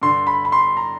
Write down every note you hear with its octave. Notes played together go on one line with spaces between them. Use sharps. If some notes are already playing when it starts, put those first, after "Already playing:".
G2 D3 C6
B5
B5
C6
A#5